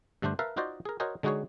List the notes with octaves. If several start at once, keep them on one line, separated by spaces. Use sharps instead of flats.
G2 D3 A3 D4 C5
A#4 B4 E5 F5 A5
D#4 F4 F#4 C5 D5 D#5
G#4 A#4
F#4 A#4 C5 C#5 D#5 G#5
D3 G#3 D#4 F#4 G#4 C#5